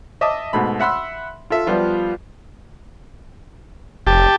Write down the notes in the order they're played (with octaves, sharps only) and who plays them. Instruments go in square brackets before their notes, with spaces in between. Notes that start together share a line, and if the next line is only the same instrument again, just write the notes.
[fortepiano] D#5 E5 A5 D6 D#6
G#2 B2 A3 B5
E5 F#5 B5 C6 E6
F4 A4 E5
F3 G3 B3 F4 F5
[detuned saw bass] F1 [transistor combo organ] G4 A5